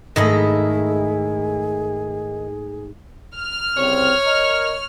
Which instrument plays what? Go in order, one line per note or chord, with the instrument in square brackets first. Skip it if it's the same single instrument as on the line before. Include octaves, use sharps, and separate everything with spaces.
[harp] G#2 A3 [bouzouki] D#3 E4 D#5 [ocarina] G#4
[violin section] F6
[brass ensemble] C2 C#3 C4 [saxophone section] C#5
[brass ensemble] A#4 D#5